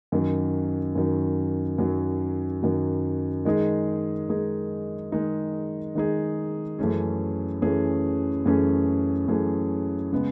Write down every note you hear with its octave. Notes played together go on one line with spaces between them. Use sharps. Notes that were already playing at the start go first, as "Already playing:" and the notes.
F#2 D#3 F#3
F#2 D#3 F#3
F#2 D#3 F#3
F#2 D#3 F#3
D#3 G#3 D#4 G#4
D#3 G#3 D#4 G#4
D#3 G#3 D#4 G#4
D#3 G#3 D#4 G#4
F#2 E3 A3 C#4 G#4
F#2 E3 A3 C#4 G#4
F#2 E3 A3 C#4 G#4
F#2 E3 A3 C#4 G#4
C#3 G#3 B3